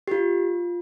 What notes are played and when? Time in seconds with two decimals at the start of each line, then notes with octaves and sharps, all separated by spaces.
0.08 G4
0.11 F4